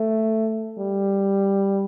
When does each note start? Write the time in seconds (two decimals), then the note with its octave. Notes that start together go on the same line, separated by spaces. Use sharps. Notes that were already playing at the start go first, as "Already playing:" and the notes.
Already playing: A3
0.78 G3